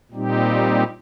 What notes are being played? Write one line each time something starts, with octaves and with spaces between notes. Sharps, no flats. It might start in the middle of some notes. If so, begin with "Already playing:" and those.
A#2 G3 C4 D#4 G4